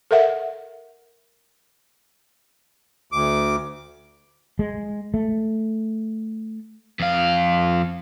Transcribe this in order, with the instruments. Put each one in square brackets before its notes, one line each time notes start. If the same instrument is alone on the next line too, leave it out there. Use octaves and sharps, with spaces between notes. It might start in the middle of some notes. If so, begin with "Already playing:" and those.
[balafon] A4 A#4 E5 F#5
[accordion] D2 D6
[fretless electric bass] G#3
A3
[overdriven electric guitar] F2 F5